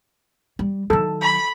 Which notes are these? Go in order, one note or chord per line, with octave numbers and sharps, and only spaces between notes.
G3
D#3 F#3 A4
B5